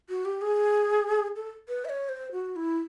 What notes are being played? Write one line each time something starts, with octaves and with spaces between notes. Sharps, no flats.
F#4
G4
G#4
A4
B4
E5
C#5
C5
F#4
E4